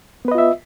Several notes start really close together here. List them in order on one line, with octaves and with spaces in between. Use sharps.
B3 B4 D#5 F4 E5